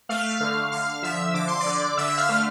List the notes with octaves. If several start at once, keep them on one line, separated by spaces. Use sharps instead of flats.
A3 F5 F6
D3
D3 F5 F6
F3 E5 E6
D3 D6
C6
D5 D6
D3
D3 E5 E6
F5 F6
A3